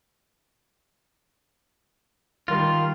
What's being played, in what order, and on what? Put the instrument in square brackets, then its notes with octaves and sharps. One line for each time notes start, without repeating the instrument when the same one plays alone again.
[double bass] D#3 G3 [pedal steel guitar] F4